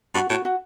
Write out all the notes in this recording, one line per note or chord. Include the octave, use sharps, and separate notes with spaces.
G2 F#4
A2 F#4
F#4